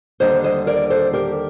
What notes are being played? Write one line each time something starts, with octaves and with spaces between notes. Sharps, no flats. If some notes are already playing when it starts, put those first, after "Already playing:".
D#2 D3 G3 D4 C5 D#5
C5 D#5
A#4 D5
A4 C5
G4 A#4